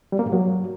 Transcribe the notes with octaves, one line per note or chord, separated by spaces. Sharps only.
G3
A#3
G#2
F#3